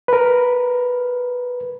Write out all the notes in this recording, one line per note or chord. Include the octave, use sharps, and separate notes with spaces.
A#4 B4